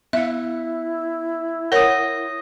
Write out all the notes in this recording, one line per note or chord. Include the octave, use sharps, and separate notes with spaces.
B3 E4 E5 F5
A#4 C#5 F#5 D#6 A#6